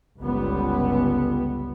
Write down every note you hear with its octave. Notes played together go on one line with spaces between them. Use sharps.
G1 C#2 G2 G3 B3